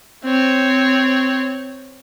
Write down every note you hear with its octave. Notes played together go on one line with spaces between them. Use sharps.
C4 C#5